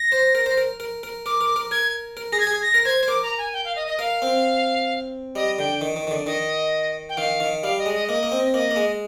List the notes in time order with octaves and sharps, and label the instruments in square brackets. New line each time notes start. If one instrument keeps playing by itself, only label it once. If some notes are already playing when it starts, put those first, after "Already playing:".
Already playing: [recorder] A#6
[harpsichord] C5
A#4
C5
A#4
A#4
A#4
[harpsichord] A#4 [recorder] D6
[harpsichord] A#4
A#4
[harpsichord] A#4 [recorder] G#6
[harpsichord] A#4
[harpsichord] G#4 [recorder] A#6
[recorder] G#6
[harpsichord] G#4
[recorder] A#6
[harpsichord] A#4
[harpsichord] C5 [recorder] G#6
[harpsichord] C5
[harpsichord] A#4 [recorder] D6
[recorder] A#5
G#5
G5
F5
D#5
D#5
[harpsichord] A#4 [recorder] F5
[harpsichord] C4
[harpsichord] G3 [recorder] D#5
[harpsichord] D3 [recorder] G5
[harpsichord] D#3
D#3
D#3
D3
[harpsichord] D#3 [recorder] D#5
[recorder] G5
[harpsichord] D#3 [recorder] F5
[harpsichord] D#3
[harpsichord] G3 [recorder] F5
[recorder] D#5
[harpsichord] G#3
[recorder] D#5
[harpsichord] A#3 [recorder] D#5
[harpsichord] A#3
C4
[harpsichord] A#3 [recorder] D#5
[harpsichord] A#3
G#3